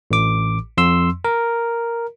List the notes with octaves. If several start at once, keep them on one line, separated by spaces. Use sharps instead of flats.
A1 D6
F2 C6 E6
A#4